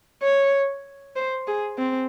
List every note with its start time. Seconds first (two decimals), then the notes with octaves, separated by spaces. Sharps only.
0.23 C#5
1.16 C5
1.48 G#4
1.78 C4